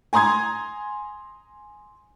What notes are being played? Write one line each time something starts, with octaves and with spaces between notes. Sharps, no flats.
G#5 A#5 C6 D#6 G#6